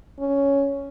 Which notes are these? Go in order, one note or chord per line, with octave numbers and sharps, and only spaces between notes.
C#4